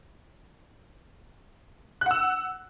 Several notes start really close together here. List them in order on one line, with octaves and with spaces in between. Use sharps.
F#6 F#5 E6